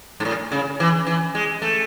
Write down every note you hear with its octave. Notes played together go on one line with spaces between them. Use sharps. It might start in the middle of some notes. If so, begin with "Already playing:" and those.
G#2
A2
C#3
E3
E3
G#3
A3